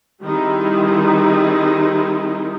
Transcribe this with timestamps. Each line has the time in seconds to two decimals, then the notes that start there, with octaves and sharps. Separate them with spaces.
0.23 D#3 G3 C4 D#4 E4 G#4